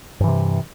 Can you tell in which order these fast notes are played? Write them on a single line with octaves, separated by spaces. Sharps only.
G2 E3 C3